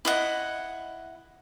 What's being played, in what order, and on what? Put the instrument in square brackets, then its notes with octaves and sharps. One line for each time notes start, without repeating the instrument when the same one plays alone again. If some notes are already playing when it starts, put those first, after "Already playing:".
[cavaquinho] E4 D#5 F#5